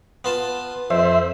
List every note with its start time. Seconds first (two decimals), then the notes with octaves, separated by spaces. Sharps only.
0.24 B3 F4 A5
0.90 F2 C5 E5